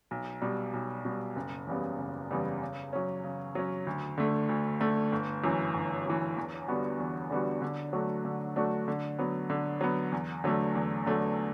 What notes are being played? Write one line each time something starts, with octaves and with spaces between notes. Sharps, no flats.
B1
B2 G3
B1
B2 G3
F#1
E2 C#3 G3 B3
F#1
E2 C#3 G3 B3
C#3
F#3 C#4
C#3
F#3 C#4
D2
D3 A3
D2
D3 A3
G1
F#2 E3
G1
F#2 E3
E2
D3 G3 B3 F#4
E2
D3 G3 B3 F#4
D3
F#3 A3 D4 F#4
D3
F#3 A3 D4 F#4
D3
F#3 B3
D3
F#3 B3
E2
D3 F#3 A3
E2
D3 F#3 A3